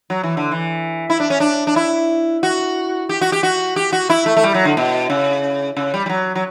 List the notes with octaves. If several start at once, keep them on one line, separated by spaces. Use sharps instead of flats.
F#3
E3
D3
E3
E4
D4
C#4
D4
D4
E4
F#4
G4
F#4
G4
F#4
G4
F#4
E4
A3
A3
G3
F#3
D3
B2
C#3
C#3
G3
G3
F#3
F#3